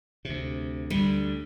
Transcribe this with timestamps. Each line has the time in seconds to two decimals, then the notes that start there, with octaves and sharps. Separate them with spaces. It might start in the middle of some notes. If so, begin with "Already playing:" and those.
0.25 D2 C3
0.90 D2 D3 G3